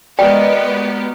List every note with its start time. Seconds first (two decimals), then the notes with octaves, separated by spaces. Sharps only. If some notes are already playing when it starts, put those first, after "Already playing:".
0.19 G#3 B3 F#4 G4 A#4 D5 D#5 G5